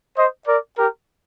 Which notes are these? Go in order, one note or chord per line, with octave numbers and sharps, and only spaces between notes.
C5 D#5
A#4 D5
G4 A#4